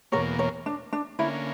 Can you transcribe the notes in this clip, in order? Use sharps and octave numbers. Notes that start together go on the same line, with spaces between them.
E2 B2 A#3 A#4 C#5
A#4 C#5
D4
D4
D3 A#3 C#4 E4